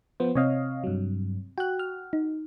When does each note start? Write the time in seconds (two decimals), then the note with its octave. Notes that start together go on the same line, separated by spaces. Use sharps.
0.20 F3 B3 C5
0.35 C3 C4 C#5 D#5 F5
0.84 G2 F#3
1.58 F#4 G5 F#6
1.79 F6
2.13 D#4